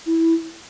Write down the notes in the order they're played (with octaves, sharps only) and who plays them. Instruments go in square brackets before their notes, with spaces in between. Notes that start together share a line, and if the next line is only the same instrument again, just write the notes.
[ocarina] E4